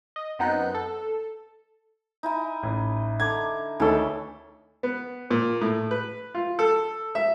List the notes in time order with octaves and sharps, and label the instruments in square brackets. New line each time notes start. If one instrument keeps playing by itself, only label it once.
[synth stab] D#5
F#2 B3 C4 D#4 F#6 G6
A4
[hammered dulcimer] D#4 E4 G#5
[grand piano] A1
[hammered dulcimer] D3 A#5 D6 [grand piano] G#6
[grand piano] D2 D#3 A4 [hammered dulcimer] E3 C#5
[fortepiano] B3
A#2
A2
B4
F4
A4
E5